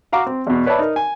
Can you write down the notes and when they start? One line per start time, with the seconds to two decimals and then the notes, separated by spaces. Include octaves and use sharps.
0.12 F#4 F5 A#5 D6
0.26 C4
0.47 E2 B2
0.66 B4 C#5 D5 E5 A5 B5
0.79 D#4 A#4
0.96 G#5